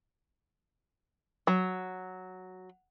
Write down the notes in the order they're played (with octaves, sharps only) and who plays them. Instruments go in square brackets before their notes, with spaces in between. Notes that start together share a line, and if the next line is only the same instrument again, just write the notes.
[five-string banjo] F#3